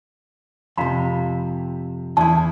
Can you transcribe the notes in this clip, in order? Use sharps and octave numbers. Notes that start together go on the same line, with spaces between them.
F2 C3 F5 A#5 B5
E2 E4 A5